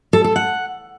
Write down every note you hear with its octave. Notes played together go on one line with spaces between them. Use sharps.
A4
A4
F#5